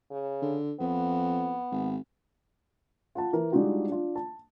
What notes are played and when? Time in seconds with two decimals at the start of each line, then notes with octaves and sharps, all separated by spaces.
0.11 C#3
0.42 D3
0.80 F2 B3
1.71 G#1
3.15 F4 F#5 A5
3.33 E3 A#4
3.52 G3 G#3 D4 D#4 F4 F#4
3.88 D4 F4
4.16 A5